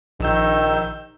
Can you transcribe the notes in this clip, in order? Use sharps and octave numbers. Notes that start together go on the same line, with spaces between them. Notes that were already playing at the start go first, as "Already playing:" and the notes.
A#1 D#3 E6 G6